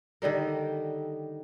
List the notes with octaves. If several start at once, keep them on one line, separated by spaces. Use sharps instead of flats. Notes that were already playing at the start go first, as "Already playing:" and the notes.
D3 D#3 G3 A#4